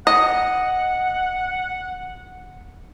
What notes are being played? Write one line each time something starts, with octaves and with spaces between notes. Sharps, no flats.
D#5 F#5